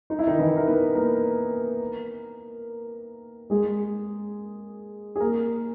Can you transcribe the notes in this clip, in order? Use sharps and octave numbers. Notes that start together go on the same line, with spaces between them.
D#4
E4
D#3 D#4
E3 E4
A#4
B3 B4
A#3 A#4
G#3 G#4
G#4
A#3 A#4